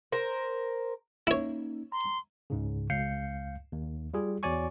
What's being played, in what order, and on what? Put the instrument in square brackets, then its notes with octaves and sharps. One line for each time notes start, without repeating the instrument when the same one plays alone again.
[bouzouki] A#4 C5
[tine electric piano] A#3 C#4 D#4 [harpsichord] E4 C#5
[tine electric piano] A#5 [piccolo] C6
[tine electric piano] C#2 G#2 C#3
C#2 F5 G6 C7 C#7
D#2
G3 F4 G#4
E2 F#4 C#5 D5 G#5 C#6